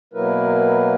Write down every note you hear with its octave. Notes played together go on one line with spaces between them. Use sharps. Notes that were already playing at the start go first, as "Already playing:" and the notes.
B2 F#3 A#3 E4 A#4 B4